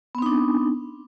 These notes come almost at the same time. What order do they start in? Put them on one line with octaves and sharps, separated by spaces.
B3 C4 D#4 D4